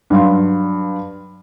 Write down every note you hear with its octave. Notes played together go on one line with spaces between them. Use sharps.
G2 F#3 F5 C6